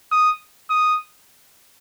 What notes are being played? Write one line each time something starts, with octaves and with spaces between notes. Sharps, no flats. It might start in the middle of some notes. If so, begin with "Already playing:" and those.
D#6
D#6